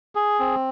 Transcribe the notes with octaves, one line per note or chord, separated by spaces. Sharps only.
G#4
C4